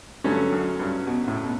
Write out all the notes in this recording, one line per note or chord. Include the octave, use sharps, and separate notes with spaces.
G2 D3 F#3 A3 C#4
F#2
G2
B2
A2
B2